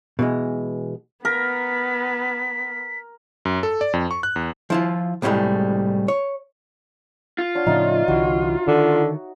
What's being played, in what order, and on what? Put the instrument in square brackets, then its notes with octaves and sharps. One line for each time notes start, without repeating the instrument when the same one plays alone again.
[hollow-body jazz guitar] B2 E3 G#3
[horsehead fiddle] B3 [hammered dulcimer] A#4 [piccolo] B6
[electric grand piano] F#2
A4
D5
F2
C#6
F#6
E2
[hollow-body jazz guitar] F3 E4 F4
C2 A2 D3 G3 G#3
C#5
[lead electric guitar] F4
[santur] D4 C#5 F#5
[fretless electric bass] A2 C#3 F3 [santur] D#4 E5 F5
[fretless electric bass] C2 D3 E3 [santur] F#4
[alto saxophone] D3 [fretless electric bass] D#3